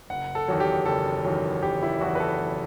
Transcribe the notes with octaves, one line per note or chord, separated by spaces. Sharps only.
F#1 F#5
A4
E2 D#3 F#3
G4
F#1 A4
E2 D#3 F#3
F#1 G4
E4
E2 D#3 F#3 F#4
B4
A4
F#1